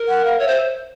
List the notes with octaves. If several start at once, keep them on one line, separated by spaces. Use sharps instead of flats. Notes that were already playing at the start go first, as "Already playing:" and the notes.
Already playing: A#4
F#5
F5
C#5 E5
C5